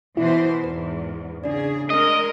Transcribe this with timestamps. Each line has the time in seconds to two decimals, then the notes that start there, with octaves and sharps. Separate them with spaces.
0.17 B2 E3 E4 C5
0.64 E2 G#2 B4
1.44 C#3 D4 G#4 D5
1.90 G#3 A#4 D#5